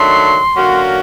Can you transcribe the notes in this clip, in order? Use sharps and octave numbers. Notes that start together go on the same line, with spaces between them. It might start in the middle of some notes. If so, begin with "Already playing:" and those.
Already playing: D#3 F#3 A3 D4 C6
D3 F#3 A#3 C#4 F#4